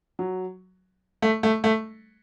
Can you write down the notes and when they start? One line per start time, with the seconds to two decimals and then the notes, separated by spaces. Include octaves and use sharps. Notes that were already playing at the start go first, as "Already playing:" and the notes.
0.19 F#3
1.22 A3
1.43 A3
1.64 A3